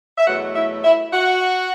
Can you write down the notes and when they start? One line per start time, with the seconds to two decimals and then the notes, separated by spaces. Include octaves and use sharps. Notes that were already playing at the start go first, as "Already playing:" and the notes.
0.18 E5
0.27 E2 B2 F#3 A3 F#4 F#5
0.56 E4 E5
0.85 E4 E5
1.13 F#4 F#5